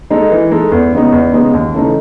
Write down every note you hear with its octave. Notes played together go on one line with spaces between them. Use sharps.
G#3 D#4 A4
E3
G#3 D#4 A4
E2
C#3 G#3 B3 D#4
E2
C#3 G#3 B3 D#4
D#2
C#3 E3 A3 D#4